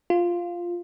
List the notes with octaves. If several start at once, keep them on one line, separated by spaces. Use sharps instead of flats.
F4